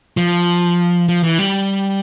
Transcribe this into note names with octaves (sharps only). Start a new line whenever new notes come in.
F3
F3
E3
G3